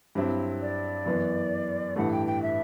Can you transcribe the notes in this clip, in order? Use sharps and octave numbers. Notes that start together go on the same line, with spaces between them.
G2 F#3 C4 E4
D5
F#2 E3 B3
A1 G2 E3 A3 F#5
G5
G5
E5